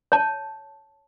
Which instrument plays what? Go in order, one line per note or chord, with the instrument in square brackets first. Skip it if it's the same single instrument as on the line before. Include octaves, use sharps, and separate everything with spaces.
[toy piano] C#5 A5